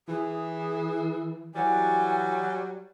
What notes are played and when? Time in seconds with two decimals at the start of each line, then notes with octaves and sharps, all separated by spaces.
0.08 E3 G#4
1.55 E3 F#3 G3 G#5